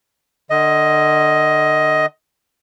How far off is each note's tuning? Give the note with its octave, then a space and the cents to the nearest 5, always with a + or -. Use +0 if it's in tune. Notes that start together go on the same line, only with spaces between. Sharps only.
D3 +35 D#5 +10